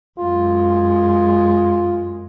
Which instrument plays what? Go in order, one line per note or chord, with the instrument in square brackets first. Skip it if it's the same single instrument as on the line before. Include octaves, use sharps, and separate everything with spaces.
[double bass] F#2 G#3 [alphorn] F4